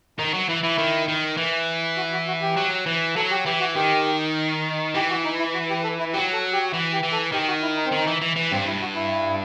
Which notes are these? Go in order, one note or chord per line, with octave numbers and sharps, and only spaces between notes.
D#3 D#4
F#3
E3 E4
E3 E4
D#3
D#3
E3
F#4
F#4
F#4
G4
F#3
E3
F#3 A4
G4
E3 G4
F#4
D#3 G4
E3 G4
F#4
D#4
E4
F#4
G4
A4
E4
F#3 G4
A4
G4
E3 F#4
G4
E3
A4
D#3 G4
F#4
E4
D#4
C4
D#3 D#4
E3
E3
E3
G2 C4
E4
F#4
E4